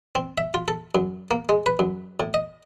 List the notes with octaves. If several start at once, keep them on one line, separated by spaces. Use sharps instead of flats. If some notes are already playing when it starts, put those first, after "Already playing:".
C4
E5
F4
A4
F#2
A#3
G#3
B4
F#2
A2
D#5